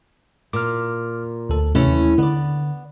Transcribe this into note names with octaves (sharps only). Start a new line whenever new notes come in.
A#2 D6 F6
D2 A4
C3 E3 A3 C#4
D#2
D3 B3 D5